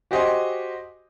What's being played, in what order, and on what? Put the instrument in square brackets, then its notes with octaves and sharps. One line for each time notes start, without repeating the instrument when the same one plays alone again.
[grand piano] F#4 G4 C5 D#5 G#5 C6